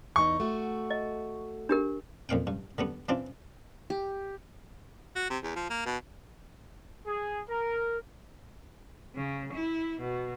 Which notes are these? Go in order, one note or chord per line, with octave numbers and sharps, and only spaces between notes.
E2 D#4 C#6
A3 F#4
D#5
D4 G4 A#4
F2 A#2 F5 G5
G2
D3 G3 B3
E3 C4 D4 F4
G4
F#4
C3
E2
F3
A#3
B2
G#4
A#4
C#3
E4
B2